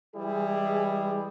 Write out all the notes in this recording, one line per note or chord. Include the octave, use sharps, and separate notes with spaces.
E3 G3 G#3 E4 G#4